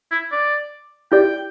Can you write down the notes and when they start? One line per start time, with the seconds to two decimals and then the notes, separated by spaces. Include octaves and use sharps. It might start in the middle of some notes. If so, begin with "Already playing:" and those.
0.11 E4
0.32 D5
1.12 E4 G4 D5 G5